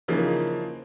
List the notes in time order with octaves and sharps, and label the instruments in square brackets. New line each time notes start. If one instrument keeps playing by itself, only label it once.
[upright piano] C#3 E3 F3 A#3 D#4